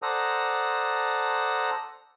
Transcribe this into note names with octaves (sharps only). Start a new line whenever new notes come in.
A4 C5 D5 F#5 A#5 D#6